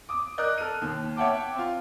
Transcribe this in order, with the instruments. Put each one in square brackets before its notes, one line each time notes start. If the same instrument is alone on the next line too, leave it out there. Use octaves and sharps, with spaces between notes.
[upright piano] D6 D#6
A#4 D5 D#5 F#6 G6
A4 F6 D#7
D#2
C#5 E5 F#5 G5 A5 D6
C4 F4